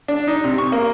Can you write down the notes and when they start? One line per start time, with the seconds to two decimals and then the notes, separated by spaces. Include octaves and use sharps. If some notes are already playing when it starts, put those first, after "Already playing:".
0.08 D4
0.27 D#4
0.44 C3
0.58 C#6
0.72 A#3